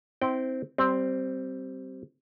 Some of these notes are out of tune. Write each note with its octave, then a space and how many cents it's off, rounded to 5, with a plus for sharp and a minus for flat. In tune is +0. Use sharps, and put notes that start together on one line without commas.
C4 -5 E4 -40 G5 -20
G3 -20 C4 +0